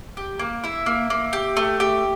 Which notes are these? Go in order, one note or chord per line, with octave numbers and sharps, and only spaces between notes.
G4
A#3
E4 E5
A#3
A#3
G4
A3
G4